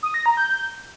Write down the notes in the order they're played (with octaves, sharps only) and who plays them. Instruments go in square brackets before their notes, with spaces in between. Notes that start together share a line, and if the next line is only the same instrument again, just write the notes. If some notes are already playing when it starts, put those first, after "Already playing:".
[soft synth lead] D#6
A#6
A#5
G6